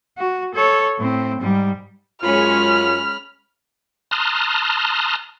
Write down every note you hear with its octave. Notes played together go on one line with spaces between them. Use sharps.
F#4
A4 C#5
A2 C4
G#2 G3
F#2 G#3 C#4 F4 B5 F6
A5 A#5 C6 D#6 F6 F#6